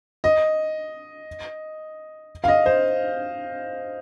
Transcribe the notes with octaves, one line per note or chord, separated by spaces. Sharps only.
D#5
F5
D#5
C5